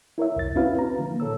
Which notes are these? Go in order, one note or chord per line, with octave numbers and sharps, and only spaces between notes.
E4 A#4 C#5 E5
C2 F2 A6
C4 C#4 E4 F#4 B4 F5
B4 A#5
D3 F3 A#3
A#2 A4 C#5 E6